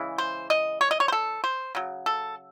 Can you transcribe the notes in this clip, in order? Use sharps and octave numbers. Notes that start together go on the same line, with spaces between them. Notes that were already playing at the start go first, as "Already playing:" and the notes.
Already playing: C#3 E3 G#3
C5
D#5
C#5
D#5
C#5
C5
A4
C5
C#3 F#3
A4